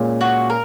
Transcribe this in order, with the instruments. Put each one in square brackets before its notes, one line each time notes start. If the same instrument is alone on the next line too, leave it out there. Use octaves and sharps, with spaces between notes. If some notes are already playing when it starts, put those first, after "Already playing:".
Already playing: [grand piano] A#2 G#3 C#4
[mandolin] F#4
A#4